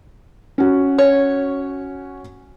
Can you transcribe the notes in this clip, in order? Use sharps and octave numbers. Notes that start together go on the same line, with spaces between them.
C#4 F#4
C#5